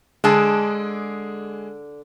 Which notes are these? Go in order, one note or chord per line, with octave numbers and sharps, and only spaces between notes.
D3 G#3 G#4 A5